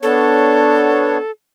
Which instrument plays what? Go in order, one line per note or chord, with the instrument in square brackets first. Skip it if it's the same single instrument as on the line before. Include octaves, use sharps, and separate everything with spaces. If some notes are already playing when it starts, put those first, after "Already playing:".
[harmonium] B3 D4 C#5 [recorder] A4